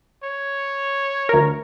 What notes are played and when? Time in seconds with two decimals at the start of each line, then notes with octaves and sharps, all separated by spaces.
0.23 C#5
1.29 D2 A#4